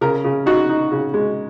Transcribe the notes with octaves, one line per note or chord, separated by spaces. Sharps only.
C#3 A#4
C#3
D#4 F#4
D#4
C#3
G#3